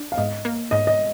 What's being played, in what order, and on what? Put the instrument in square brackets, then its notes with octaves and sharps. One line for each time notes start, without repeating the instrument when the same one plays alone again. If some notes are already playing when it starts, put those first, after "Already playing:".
Already playing: [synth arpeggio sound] D4
[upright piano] F5
[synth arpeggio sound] G#2 [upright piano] D#5
[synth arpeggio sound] A#3
[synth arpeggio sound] G#2 [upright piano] D#5
[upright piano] D#5